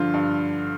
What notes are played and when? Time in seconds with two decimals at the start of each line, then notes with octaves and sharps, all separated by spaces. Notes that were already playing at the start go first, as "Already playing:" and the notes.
Already playing: G2 D3 F3 F4
0.14 G2